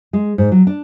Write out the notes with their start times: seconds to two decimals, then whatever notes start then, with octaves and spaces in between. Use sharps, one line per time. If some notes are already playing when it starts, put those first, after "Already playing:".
0.13 G#3
0.38 G#2
0.52 F#3
0.67 D4